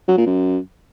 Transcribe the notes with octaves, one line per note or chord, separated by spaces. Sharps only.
F#3
A#2
F#2